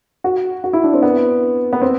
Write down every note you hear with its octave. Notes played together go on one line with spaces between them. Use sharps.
F#4
F#4
E4
D4
C4
B3
B3
C4